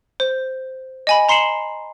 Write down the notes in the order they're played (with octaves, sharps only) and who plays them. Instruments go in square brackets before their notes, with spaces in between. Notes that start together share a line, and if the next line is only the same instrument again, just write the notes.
[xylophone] C5
D#5 G#5 B5
A#5 C6 C7 C#7 E7 F#7